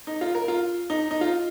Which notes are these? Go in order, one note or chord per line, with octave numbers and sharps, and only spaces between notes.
D#4
F4
A#4
F4
D#4
D#4
F4